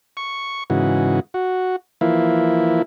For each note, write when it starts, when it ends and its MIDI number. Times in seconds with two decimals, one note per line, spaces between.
0.17 0.64 85
0.70 1.20 44
0.70 1.20 49
0.70 1.20 52
0.70 1.20 66
1.34 1.76 66
2.01 2.82 52
2.01 2.82 53
2.01 2.82 58
2.01 2.82 64